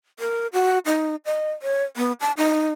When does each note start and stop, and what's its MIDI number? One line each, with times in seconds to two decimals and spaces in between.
0.19 0.47 70
0.53 0.79 66
0.86 1.16 63
1.25 1.51 75
1.62 1.83 73
1.97 2.12 59
2.20 2.32 81
2.37 2.72 63